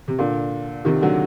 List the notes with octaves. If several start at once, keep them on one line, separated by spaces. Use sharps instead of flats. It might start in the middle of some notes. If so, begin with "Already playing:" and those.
C3
A#2 D3
C3 D#3
D3 F#3